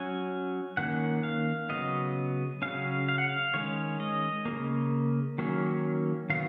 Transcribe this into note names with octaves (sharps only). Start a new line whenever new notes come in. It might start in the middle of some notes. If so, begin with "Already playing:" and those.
Already playing: F#3 C#4 G#5
D#3 A#3 C#4 F#5
F5
C#3 F#3 B3 D#5
C#3 F#3 C#4 F5
F5
F#5
F5
D#3 G#3 C#4 C#5
D#5
F3 A#3
C#3
D#3 F#3 A#3 C#4
D#3 F#3 B3 F5